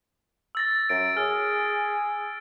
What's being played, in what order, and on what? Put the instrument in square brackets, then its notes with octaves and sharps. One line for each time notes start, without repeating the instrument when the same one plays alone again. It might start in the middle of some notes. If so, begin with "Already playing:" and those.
[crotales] E6 A6 A#6
[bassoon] F#2 [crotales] A6 D7
[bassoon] G#4 [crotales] F6